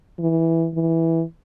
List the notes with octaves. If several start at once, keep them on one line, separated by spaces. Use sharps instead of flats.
E3
E3